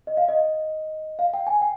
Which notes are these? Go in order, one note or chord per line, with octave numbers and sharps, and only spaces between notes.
D#5
F5
D#5
F5
G5
G#5
G5